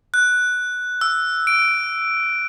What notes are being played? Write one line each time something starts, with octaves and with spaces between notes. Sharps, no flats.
F#6
E6
D7